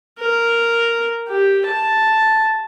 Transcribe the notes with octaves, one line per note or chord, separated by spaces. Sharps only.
A#4
G4
A5